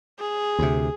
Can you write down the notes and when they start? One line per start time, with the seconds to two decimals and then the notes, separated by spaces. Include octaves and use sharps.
0.19 G#4
0.59 D2 C3